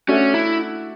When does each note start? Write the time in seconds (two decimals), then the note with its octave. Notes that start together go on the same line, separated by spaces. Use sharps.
0.08 A3 C#4 D4 F#4
0.34 E4